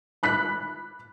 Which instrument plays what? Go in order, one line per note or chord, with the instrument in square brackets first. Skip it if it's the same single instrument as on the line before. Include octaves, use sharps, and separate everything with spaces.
[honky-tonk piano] B5 F#6 B6